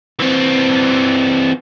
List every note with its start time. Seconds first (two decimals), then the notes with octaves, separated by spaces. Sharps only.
0.19 E3 C4